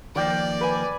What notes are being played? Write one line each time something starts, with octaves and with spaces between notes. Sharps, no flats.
D#3 F3 A#3 D5 G5 D6
B4 G#5